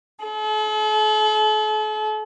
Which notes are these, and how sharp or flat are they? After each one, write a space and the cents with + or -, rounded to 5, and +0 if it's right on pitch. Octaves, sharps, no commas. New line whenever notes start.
A4 -45